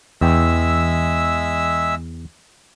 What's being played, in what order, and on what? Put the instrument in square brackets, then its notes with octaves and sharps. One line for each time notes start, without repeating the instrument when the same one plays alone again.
[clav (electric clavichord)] E2 G5 [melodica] G#3 E5 E6